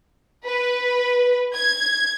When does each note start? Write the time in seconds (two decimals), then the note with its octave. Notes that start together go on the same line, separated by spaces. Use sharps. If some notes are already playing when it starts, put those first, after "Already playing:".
0.46 B4
1.54 G#6